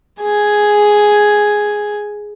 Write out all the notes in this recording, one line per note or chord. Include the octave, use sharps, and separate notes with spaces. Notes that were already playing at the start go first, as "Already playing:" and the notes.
G#4 G#5